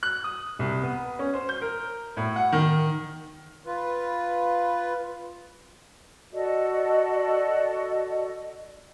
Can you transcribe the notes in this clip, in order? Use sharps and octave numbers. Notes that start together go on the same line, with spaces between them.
F#6
D#6
C2
B3
C#4
C5
G6
A#4
A2
F#5
D#3
F4 B4
F#4 A4 D5 D#5